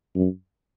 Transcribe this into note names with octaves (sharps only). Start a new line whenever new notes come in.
F#2